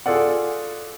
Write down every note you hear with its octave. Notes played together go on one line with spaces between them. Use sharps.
F4 G#4 A4 D5 F#5